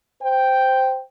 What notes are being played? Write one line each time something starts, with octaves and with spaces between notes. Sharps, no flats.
C5 G5